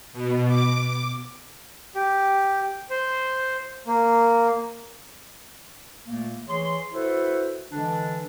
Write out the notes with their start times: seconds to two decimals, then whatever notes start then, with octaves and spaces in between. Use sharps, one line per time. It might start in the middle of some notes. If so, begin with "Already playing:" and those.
0.13 B2
0.47 D6
1.95 G4
2.90 C5
3.87 A#3
6.05 A#2 A3 A#3
6.47 E3 G#4 C#5 C6
6.92 E4 F#4 A4 B4 C5
7.71 D3 E3 G#3 D4